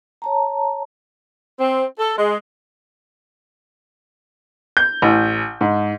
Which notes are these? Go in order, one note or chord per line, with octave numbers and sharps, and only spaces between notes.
C#5 A5 A#5
C4
A4
G#3
G6
A1
G#2